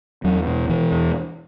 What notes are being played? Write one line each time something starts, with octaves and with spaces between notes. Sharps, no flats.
E2 F#3
B2
B2 E3
E2